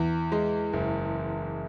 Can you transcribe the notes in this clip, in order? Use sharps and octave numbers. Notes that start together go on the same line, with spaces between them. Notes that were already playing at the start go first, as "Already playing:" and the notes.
Already playing: E2
G#3
F#1